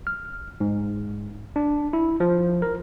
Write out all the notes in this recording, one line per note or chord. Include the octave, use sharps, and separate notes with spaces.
F6
G#2
D4
E4
F3
A#4